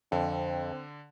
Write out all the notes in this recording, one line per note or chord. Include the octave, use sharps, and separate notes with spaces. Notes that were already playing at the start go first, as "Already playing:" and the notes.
F2 D3 C4